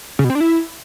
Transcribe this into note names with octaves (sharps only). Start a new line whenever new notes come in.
C#3
B2
C4
D4
E4